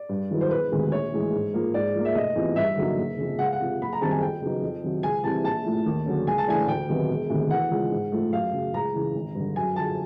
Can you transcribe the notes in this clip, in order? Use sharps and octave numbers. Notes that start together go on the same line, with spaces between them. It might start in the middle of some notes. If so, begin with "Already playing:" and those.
Already playing: D5
G2
D#3 F#3 B3 E4
C5
E1 B4
D2 C3 D#3 G#3
A#1 C#5
A2 E3 G#3
G#2
F3 A#3
G#2 D5
F3 A#3
E5
F1 D#5
E2 C3 F3
G2 E5
D3 F#3 A#3 D#4
F#1
F2 C#3
C#2 F#5
F5
F#5
C3 F3
F#1 B5
A#5
F#2 D#3 G3 C4 A5
G#5
F2 G5
C#3 F#3 B3 D#4
F2
C3 D#3 F#3
C#2 G#5
C3 E3 G3 C4 A5
A#1 A5
A2 F3 A3
D#2
D3 F#3 A#3 C#4
C#2 G#5
A5
C#3 E3 A3 D4 G#5
D2 G5
C3 D#3 F#3 B3
E1
D2 C3 D#3
E2 F#5
C#3 F3 G#3
G#2
F3 A3
F#2 F5
C#3 F#3
C#2 A#5
C#3 E3
G#1
G2 D3
F#2 G#5
D3 F3 A5